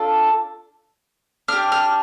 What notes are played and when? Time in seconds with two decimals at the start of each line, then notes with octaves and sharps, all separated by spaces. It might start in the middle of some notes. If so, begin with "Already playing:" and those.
Already playing: D4 F4 A4
1.48 D4 G4 F6
1.72 F6